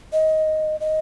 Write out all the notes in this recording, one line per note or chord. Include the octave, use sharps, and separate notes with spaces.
D#5
D#5